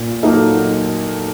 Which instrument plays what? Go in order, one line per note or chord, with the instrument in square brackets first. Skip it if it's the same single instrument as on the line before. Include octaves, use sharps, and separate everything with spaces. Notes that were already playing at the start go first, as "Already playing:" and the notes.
Already playing: [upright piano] A#2
F#3 A#3 D#4 A4